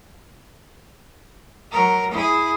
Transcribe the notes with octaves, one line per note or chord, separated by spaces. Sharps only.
F#3 A#4
E4 G#4